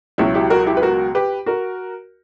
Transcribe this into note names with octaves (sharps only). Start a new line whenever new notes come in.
C#2 B2 F#3 C#4 E4
E4 G4
F#4 A#4
E4 G4
B4
F#4 A#4
G4 B4
F#4 A#4